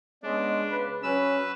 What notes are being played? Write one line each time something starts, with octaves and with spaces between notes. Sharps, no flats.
G#3 B3 C#4 D4
C#3 B4
F#3 C#4 B4 E6